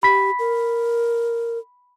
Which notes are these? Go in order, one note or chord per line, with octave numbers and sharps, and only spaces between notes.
G4 B5 B6
A#4